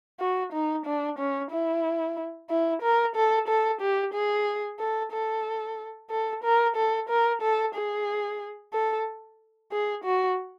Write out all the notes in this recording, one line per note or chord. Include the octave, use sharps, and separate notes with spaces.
F#4
D#4
D4
C#4
E4
E4
A#4
A4
A4
G4
G#4
A4
A4
A4
A#4
A4
A#4
A4
G#4
A4
G#4
F#4